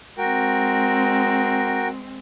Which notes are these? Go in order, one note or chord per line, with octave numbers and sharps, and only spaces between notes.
G#3 C4 F#4 A#4 G5